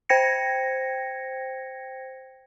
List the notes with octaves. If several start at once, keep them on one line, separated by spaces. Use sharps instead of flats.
C5 G5 G#6 A#6 C#7